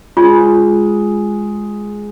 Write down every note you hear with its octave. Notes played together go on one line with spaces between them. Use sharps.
G#3 F4